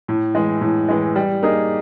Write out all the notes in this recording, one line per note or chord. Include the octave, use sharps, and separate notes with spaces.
A2
E3 G#3
A2
E3 G#3
G3
A#3 D#4 G#4